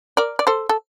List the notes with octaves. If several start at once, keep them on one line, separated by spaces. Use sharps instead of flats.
A#4 D5
D5
A4 C5
A4